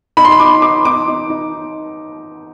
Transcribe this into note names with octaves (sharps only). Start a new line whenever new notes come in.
D#4 B5
C6
B5
D#4 D6
D#4 D6
D#4 D6
D#4
D#4